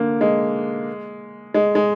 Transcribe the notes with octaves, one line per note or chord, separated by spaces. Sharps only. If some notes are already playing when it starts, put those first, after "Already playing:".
Already playing: D3 A#3
G#3
G#3
G#3